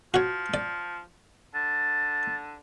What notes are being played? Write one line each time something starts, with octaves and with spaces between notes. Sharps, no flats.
F3 F#4 C#5
D5
D3 A6